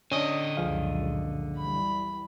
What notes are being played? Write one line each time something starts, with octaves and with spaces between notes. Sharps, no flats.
D3 C#4 D4 D#5
C#2 F#2 A#2 F3 G#4 F5
E3 G3 B5